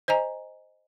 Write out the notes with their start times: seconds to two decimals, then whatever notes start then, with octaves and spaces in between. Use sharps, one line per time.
0.08 C5 D#5 G#5 A#5